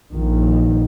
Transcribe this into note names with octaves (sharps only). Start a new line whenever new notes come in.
A#1 D#3